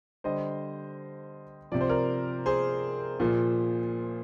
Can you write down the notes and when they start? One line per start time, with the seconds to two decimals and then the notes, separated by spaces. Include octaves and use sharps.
0.24 D3 G3 C5 D#5
1.72 C3 F3 D5
1.81 C5
1.89 A#4 D5
2.46 G#4 C5
3.20 A#2 F3